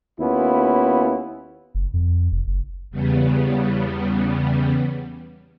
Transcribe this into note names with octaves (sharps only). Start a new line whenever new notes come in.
D#2 B3 C#4 E4 F4
F#1
F2
F1
F#1
E2 C#3 G3 B3